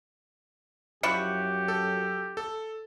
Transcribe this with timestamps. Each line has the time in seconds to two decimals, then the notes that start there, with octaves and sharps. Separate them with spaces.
1.03 F#2 F3 E4 F#4 G4 C#7
1.68 A4
2.37 A4